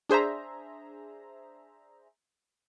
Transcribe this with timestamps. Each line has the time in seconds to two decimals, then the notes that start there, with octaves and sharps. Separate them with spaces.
0.09 D4 G#4 C5 E5 A#5